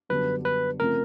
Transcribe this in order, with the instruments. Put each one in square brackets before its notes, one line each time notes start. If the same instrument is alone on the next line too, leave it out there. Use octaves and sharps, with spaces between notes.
[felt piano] F#2 D3 G3 B3 D4 [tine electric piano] B4
[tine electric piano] B4
[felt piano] C#3 F3 A3 C4 [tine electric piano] A#4